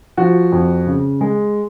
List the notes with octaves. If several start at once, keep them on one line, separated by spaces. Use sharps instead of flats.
F3 F#4
F2
C#3
G#3